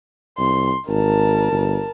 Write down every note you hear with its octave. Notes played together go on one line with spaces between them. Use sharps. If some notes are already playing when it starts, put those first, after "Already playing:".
C2 C6
G#1 A#4 A5
G1